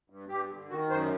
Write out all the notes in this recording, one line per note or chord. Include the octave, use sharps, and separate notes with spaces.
G2
G2 G4
D3
D#3 F#4
F#2 C5